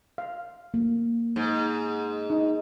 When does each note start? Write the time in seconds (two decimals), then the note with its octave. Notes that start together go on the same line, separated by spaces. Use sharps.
0.18 F5
0.74 A#3
1.36 G#2
2.30 D#4